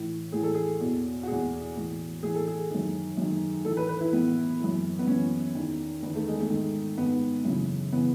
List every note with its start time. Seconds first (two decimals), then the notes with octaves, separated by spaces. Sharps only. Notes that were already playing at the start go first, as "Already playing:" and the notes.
Already playing: A2 E3
0.32 A2 E3 G#4
0.43 A4
0.54 G#4
0.80 E2 B2
1.23 F#4
1.28 E2 B2 G#4
1.76 A2 E3
2.23 A2 E3 G#4
2.35 A4
2.47 G#4
2.71 F#2 D#3
3.17 F#2 D#3
3.65 A2 E3 A4
3.77 B4
3.89 B4
4.01 E4
4.12 A2 E3 B3
4.60 F#2 E3
4.99 B3
5.07 F#2 E3 C#4
5.55 E2 D#3
6.02 E2 D#3 B3
6.15 A3
6.28 G#3
6.40 A3
6.50 G#2 D#3
6.97 G#2 D#3 B3
7.45 F#2 C#3 E3
7.92 C#3 E3 B3